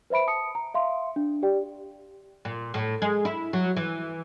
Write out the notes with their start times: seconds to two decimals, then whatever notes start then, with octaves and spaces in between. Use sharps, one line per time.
0.10 B4 C5 E5 B5 D7
0.27 A5 D#6 C#7
0.55 A#5
0.74 E5 F5 C6
1.16 D4
1.43 G4 D5 G5
2.45 A#2
2.74 A2
3.02 G#3
3.25 E4
3.53 F#3
3.77 E3